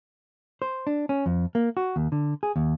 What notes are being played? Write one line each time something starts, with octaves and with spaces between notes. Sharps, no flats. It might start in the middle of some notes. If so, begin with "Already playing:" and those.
C5
D4
C#4
F2
A#3
F#4
D#2
D3
G#4
D#2